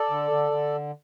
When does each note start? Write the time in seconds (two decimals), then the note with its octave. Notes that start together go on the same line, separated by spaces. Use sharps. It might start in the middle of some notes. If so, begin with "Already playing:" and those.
Already playing: A4 D5
0.10 D3
0.31 D3
0.51 D3